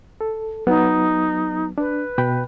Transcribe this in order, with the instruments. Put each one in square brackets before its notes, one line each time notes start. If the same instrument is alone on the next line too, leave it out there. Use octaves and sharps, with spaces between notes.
[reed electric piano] A4
[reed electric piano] F#3 B3 [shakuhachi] D#4
[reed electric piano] D4 [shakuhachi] B4
[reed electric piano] B2 G5 B5